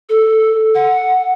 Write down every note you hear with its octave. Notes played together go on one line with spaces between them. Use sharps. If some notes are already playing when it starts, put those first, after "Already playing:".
A4
F#5